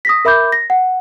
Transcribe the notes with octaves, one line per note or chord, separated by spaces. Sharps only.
D#6 A#6 B6
A#4 E5 B5 D6 G6
A#6
F#5